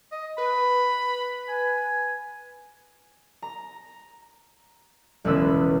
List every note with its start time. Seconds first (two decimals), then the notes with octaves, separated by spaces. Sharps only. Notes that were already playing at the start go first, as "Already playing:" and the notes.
0.12 D#5
0.38 B4 B5
1.49 G#5
3.42 A#5
5.25 E1 C#2 E3 C#4 B4 E6